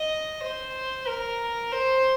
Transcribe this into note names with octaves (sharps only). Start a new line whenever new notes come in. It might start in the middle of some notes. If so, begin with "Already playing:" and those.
Already playing: D#5
C5
A#4
C5